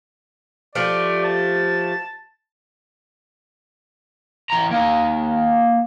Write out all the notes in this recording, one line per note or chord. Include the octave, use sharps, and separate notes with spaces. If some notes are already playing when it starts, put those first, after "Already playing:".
F3 A3 G4 D5
A5
E3 A#5
A#3 D#4